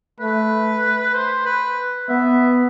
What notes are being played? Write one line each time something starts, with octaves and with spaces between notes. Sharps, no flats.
A3 B4
C5
B4
B3 E5